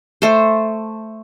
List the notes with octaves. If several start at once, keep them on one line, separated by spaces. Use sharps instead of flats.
A3 C5